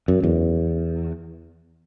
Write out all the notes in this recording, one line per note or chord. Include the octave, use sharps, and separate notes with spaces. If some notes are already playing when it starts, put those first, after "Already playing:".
F#2
E2